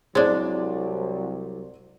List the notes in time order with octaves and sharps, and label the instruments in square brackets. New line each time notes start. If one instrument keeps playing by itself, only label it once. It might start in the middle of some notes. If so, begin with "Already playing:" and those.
[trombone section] C2 F#3 [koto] G#3 D4 [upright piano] C5 D5